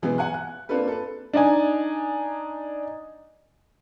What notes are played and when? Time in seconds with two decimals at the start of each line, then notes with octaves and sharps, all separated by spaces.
0.02 B2 E3 G#3 B3
0.18 F#5 G#5 F#6
0.34 F#6
0.69 A#3 C4 D4 F4 A4 B4
0.88 A4 B4
1.34 D4 D#4 G#5